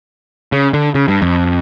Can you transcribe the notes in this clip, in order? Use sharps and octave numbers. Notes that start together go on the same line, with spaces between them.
C#3
D3
C#3
G2
F2